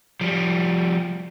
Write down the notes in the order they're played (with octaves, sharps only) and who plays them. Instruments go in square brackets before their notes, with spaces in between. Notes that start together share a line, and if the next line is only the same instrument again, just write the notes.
[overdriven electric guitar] F3 G3